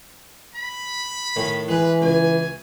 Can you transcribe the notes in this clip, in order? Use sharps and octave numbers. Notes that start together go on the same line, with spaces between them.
B5
A2 D#3
E3 G#3 B4
C#2 G#5